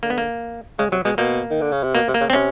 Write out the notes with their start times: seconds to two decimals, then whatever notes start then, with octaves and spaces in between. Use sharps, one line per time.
0.03 D3 A#3
0.10 B3
0.18 A#3
0.79 C#3 G#3
0.92 C3 F#3
1.05 B2 G#3
1.18 B2 A#3
1.51 D#3
1.61 D3
1.72 C#3
1.83 C3
1.95 B2 A#3
2.08 C3
2.14 A#3
2.21 C#3
2.30 C4
2.33 C3 C#4